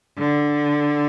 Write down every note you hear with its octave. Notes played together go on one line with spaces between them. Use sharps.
D3